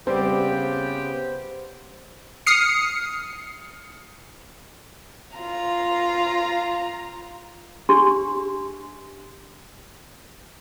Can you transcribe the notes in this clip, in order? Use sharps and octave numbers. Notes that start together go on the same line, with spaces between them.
C#3 G3 B3 C4 G4 B4 C5
D#6 F6 C7 C#7
F4 A#5
D4 G4 C6